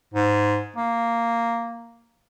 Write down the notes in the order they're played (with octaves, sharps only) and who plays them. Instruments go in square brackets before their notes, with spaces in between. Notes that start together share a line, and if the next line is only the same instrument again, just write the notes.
[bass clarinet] G#2
A#3